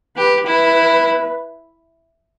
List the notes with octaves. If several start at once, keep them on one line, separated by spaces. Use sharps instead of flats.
G4 B4
E4 B4